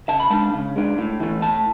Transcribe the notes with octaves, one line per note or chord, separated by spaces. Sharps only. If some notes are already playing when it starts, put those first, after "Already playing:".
C#3 A5
B5
G#3 D4 A5
C#3
G#3 D4
A2
E3 A3
A2 A5